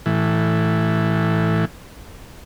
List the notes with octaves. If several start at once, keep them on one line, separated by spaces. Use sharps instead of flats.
A2 E3